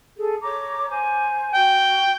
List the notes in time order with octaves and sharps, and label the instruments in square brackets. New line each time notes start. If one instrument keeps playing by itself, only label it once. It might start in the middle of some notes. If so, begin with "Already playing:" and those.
[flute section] G#4 A4
C#5 A#5 D6
C5 G#5
[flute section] F#4 [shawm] G5